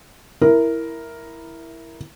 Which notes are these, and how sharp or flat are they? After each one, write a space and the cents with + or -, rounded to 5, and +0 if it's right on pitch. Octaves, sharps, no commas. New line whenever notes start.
E4 +0 A#4 +0